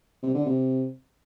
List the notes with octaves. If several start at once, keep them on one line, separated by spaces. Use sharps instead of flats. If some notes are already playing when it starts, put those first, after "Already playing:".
C3
D3
C3